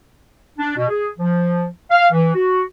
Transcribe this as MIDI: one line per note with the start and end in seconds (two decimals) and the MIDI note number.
0.59 0.72 62
0.77 0.87 47
0.89 1.09 68
1.19 1.66 53
1.91 2.06 77
2.12 2.33 52
2.35 2.62 66